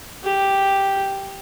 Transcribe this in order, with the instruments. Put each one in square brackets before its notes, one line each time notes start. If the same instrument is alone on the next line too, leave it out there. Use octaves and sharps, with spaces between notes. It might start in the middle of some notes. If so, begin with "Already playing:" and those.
[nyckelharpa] G4